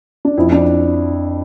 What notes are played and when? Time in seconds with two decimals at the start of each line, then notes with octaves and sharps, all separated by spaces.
0.25 D4
0.37 F2 E4
0.52 D4